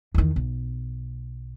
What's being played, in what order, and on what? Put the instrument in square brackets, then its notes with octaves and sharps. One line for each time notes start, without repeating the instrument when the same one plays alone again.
[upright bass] E2 D#3
B1